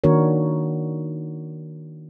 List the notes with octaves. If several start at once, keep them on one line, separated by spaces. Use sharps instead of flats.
D#3 A#3 D4 F#4 A#4 C#5